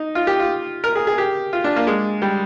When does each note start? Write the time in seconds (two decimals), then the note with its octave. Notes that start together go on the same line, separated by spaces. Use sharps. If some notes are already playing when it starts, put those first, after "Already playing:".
Already playing: D#4
0.15 F4
0.27 G4
0.40 F4
0.84 A#4
0.95 G#4
1.07 G#4
1.18 G4
1.53 F4
1.64 D4
1.76 A#3
1.87 G#3
2.22 G3